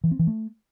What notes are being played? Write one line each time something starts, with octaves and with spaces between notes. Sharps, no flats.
E3
C4
E3
A3